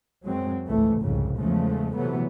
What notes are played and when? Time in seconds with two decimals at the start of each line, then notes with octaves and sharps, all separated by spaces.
0.25 F#2 F#3 G#3 C4
0.66 G#1 C#2 E3 A3
1.01 C2 F2 G#2 C#3
1.37 E2 C#3 F3 G#3 A3
1.95 C3 E3 F#3 A3 B3